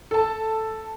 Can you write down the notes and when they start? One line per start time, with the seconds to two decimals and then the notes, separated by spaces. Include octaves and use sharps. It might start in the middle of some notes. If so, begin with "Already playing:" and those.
0.11 A4 A5